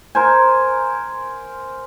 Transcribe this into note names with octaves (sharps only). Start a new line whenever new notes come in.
A#4 C5 G#5